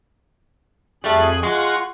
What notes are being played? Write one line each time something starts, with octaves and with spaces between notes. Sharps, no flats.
F2 G3 A3 G#4 F#6
G#3 F4 F#5 C#6